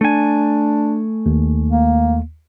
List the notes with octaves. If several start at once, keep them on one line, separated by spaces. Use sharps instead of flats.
A3 D4 G#5
D#2
A#3